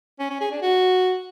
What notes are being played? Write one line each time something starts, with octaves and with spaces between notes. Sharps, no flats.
C#4
C#4
G#4
D4
F#4